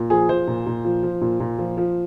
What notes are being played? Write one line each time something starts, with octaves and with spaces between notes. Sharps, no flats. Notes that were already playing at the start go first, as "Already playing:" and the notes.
Already playing: A#2
F3 G#4
F3 C5
A#2
A#2
F3
F3
A#2
A#2
F3
F3